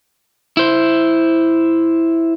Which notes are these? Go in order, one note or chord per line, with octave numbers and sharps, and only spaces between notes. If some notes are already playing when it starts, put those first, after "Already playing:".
E4 C5